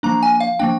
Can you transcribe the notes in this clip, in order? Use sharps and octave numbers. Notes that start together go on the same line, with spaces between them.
F3 A#3 D4 A#5
G#5
F5
F3 A#3 D4 G5